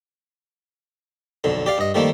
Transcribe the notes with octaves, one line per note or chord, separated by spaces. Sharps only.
B1 F2 D3
G4 D5 F5
G2 D#5
D#3 F3 G3 A3 A#3